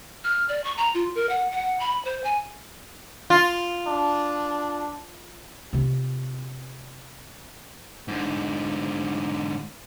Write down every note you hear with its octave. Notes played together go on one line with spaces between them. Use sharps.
F6
D5
C#6
A#5
F4
A#4
F#5
F#5
B5
C5
G#5
F4
D4
C3 F4
G#2 D3